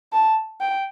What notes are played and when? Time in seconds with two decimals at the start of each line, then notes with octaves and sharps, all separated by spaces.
0.13 A5
0.61 G5